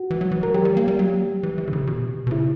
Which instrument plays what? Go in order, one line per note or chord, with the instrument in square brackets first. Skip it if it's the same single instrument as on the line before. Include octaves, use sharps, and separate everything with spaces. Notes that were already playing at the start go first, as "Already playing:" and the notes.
Already playing: [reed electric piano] F#4
[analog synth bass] E3
F#3
E3
[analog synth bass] E3 [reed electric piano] A#4
[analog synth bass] F#3 [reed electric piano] G4
[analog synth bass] G3
A#3
G3
F#3
E3
E3
D3
C#3
B2
B2
[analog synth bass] C#3 [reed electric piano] E4